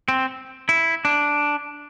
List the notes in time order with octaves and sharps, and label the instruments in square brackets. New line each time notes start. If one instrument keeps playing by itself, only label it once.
[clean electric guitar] C4
E4
D4